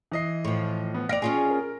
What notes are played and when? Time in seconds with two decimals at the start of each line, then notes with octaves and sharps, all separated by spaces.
0.12 E3 D#5 C7
0.45 A2 F3
0.94 B3
1.09 D5 F5 A#6 D7 F7
1.22 C#4 F4 G#4
1.51 A#4